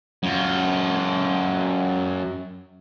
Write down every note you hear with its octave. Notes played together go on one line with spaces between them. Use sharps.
F#2 F4